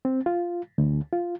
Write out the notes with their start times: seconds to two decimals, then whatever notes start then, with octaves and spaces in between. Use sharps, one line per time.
0.05 C4
0.26 F4
0.78 D2
1.13 F4